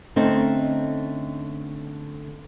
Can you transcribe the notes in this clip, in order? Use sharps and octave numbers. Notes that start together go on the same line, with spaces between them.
D3 A3 C4 C#4 D#4